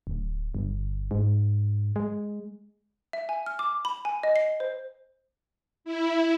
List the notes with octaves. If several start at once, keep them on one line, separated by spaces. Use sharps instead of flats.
D1
G1
G#2
G#3
E5
G#5
F6
D6
B5
G#5
D#5
C7
C5
E4